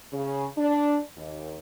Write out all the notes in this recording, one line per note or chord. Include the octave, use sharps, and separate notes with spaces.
C#3
D4
D#2